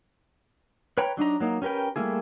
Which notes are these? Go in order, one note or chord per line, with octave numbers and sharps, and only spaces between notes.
B4 C#5 G5 A#5 B5
F#3 D4 D#4 A#5
F#3 A#3 D#4
C#4 G4 A#4 B4 G5
G3 A3 A#3 E4 G#4